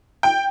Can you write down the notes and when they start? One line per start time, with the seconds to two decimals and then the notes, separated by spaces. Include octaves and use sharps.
0.23 G5